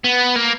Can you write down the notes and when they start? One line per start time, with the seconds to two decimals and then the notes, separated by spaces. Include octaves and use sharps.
0.04 B3
0.36 A#3